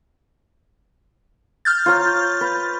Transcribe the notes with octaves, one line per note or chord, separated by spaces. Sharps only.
F6 G6 A6
F4 C#5 A#5
B4